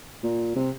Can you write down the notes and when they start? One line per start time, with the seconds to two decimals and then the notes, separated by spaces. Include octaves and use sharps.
0.23 A#2
0.56 C3